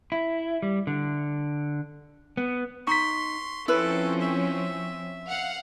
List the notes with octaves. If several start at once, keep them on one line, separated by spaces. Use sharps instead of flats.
E4
G3
D3
B3
D#4 C6 C#6 B6
F3 C4 C#4 E4 A4 B4
E5
F5 F#5